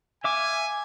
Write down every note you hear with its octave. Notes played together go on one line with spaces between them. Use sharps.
E5 F5 G#5 D6